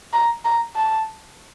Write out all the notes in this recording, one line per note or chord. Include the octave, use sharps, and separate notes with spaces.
A#5
A#5
A5